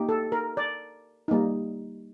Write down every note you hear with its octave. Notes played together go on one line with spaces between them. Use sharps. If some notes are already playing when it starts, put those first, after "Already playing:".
Already playing: A#3 D#4 G4
A4
A#4
D5
G3 A#3 D#4